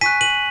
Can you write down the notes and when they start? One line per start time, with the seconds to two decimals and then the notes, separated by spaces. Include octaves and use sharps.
0.01 G#5 C#6 F#6 B6 D#7
0.21 D#7 F#7